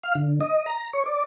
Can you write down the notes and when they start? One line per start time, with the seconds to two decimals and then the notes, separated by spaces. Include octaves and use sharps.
0.03 F5
0.15 D3
0.41 D#5
0.66 A#5
0.93 C#5
1.06 D5